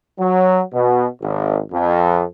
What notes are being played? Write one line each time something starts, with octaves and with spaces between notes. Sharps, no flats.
F#3
B2
G#1
F2